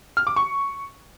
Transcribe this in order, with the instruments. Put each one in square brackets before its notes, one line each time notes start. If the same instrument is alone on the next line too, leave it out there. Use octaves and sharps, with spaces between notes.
[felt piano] F6
D6
C#6